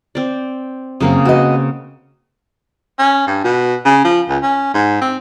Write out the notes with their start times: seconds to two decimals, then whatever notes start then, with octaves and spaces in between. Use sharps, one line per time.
0.15 C4 D5
1.01 F#2 C#3 A#3 C4
1.25 F#4 B4 D#5
2.99 C#4
3.27 G2
3.44 B2
3.85 C#3
4.05 F3
4.28 C#2
4.43 C#4
4.74 G#2
5.01 C4